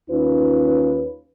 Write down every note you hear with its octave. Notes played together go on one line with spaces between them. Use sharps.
D#2 C#4 D#4 F4 B4